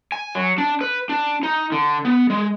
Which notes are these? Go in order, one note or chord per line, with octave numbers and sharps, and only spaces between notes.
G#5
F#3
D4
B4
D4
D#4
D3
B3
G#3